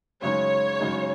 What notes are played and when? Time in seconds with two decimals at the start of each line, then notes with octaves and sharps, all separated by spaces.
0.21 F#2 C#3 G#3 D#4 C#5
0.79 F#2 C#3 G#3 D#4